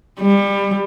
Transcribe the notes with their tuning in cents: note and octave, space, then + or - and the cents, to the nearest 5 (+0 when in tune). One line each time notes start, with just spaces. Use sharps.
G3 +25